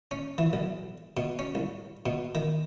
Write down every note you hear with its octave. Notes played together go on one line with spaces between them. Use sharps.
C#4
E3
B1
B2
C#4
C2
B2
D#3